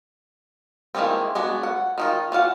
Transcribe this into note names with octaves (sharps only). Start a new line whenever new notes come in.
D#3 E3 G#3 A#3 C4
G#3 B3 D4 F#4
F#5
D#3 D#4 F4
E3 F4 F5 F#5